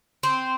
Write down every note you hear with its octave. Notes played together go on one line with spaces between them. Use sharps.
C4